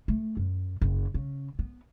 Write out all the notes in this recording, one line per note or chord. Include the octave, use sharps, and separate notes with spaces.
A3
F#2
F#1
C#3
B3